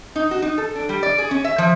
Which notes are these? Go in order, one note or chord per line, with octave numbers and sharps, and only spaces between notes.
D#4
F#4
D#4
A4
D4
G3
D5
G#4
C#4
E5
F3